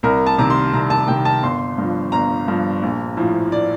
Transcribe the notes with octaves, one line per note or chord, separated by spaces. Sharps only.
C2 A#4
A5
C3 D#3 A#5
C6
C2 A#5
A5
C3 D#3 G5
A5
G1 C6
G2 F3
G1 A#5
G2 F3
A#1
A2 F3
D5